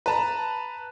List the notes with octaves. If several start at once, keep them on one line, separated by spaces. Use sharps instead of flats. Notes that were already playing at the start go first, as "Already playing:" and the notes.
B4 A5 A#5